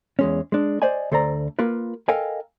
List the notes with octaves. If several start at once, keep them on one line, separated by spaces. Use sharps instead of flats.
E2 G#3 C#4
G#3 D4
C5 D5 D#5 G#5
D2 A4 C5 D5 A#5
A#3 F4 A#4 B4
A4 A#4 D#5 F5 G5 G#5